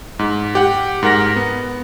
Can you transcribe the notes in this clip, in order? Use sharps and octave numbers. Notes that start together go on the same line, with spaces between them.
G#2
G4 F#5
G#2 A#4 F#5 A#6
B3